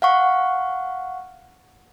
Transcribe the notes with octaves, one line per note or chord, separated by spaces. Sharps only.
F5 F#5 C#6